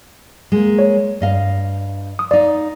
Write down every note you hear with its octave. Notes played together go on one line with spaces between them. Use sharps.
G#3 A#3
C#5
G2 D#5 F5
D#6
D#4 D5 F5